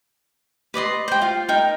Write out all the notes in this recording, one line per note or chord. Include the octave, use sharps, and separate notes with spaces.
B4 D5 D#5 C6
C5 G5
F4 F5
D#4 A#4 G5